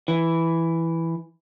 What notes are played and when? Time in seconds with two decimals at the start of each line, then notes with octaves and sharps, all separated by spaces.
0.08 E3